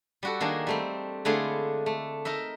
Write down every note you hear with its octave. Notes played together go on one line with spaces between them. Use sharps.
G3 F#4 A4
D#3 A#3 D4 G#4
G3 A3 C4
D3 G#3 A3 E4 F4 G#4
A3
D#4 A#4 E5